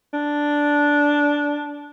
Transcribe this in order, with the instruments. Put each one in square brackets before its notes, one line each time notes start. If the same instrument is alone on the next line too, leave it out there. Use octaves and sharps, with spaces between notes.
[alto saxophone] D4